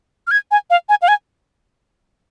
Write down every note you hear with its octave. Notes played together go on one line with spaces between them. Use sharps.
F6
G#6
G#5
F5
G#5
F5
G#5